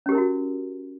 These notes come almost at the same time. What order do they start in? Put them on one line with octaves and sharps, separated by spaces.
C#4 G4 A#4 E4 F#4